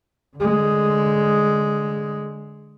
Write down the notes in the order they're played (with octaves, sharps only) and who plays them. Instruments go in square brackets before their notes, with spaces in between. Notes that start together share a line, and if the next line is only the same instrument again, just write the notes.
[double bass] D3 G#3